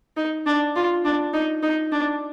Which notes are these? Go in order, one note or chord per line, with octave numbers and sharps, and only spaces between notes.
D#4
D4
F4
D4
D#4
D#4
D4